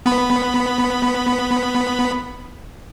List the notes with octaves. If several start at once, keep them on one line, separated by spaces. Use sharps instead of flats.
B3 B5